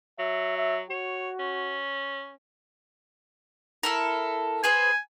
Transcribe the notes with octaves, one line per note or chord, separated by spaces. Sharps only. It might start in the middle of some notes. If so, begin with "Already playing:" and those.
F#3 E5
E5
F#4 C#5
C#4
E4 A4 A#4
G#4 B4 C5 G#5